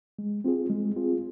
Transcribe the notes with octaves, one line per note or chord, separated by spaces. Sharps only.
G#3
C4 F4 G#4
G#3
C4 F4 G#4